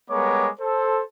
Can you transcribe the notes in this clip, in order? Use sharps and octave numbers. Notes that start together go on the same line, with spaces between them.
G3 G#3 B3 A#4 C#5 D6
A4 C5